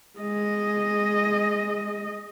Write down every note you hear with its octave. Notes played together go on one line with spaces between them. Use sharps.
G#3 D#5